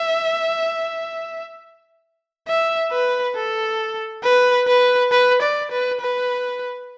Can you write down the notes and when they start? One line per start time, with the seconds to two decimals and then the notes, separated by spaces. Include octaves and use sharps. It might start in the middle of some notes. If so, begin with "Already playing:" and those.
Already playing: E5
2.48 E5
2.92 B4
3.36 A4
4.24 B4
4.67 B4
5.11 B4
5.42 D5
5.71 B4
6.01 B4